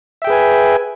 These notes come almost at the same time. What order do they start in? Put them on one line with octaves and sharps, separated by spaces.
E5 G5 G#4 B4 G#5